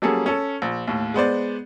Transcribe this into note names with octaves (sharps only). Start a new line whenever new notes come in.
F#3 G3 A#3 C#4 G#4 A4
C#4 A4
A#1
D#2 A2
G#3 B3 C5 D5